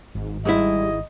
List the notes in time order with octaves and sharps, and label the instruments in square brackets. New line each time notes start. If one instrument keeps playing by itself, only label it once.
[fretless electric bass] G#1 [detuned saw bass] G#2
[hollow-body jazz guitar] G#2 G#3 E4 [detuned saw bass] G3 [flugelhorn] D#5